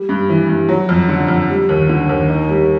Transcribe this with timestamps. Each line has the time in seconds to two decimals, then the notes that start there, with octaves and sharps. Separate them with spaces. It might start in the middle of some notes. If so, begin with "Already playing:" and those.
Already playing: G3
0.09 G2
0.29 E3
0.49 G2
0.69 F#3
0.89 F2
1.09 D3
1.28 F2
1.49 G3
1.69 D#2
1.89 D3
2.09 D#2
2.29 D#4
2.49 G3